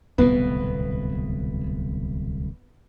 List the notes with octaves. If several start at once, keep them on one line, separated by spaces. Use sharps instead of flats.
D1 C2 B2 B3